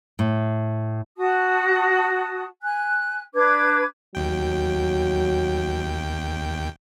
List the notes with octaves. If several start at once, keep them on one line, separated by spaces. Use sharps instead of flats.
A2
F#4 A5 D#6
G#5 F#6
D4 B4 D6 G#6
D#2 F#3 G5